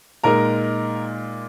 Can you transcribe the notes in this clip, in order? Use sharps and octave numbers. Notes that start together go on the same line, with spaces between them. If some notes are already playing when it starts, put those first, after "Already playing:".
A#2 G#3 D#4 A#4 A#5